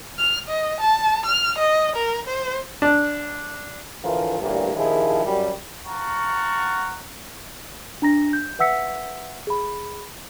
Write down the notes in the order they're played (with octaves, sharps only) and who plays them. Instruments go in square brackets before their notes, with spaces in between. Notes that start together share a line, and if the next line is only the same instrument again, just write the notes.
[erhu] F6
D#5
A5
F6
D#5
A#4
C5
[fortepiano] D4
[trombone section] D2 A2 E3 F3 F4 A#4
A1 D2 G2 A#2 A#3 D4
A#1 D#2 D#3 F3 E4 G#4
F#2 G3
[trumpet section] F5 F#5 A5 A#5 C#6
[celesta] D4 A#5 A#6
G6
B4 E5 F#5 E6 B6 C#7
G#4 B5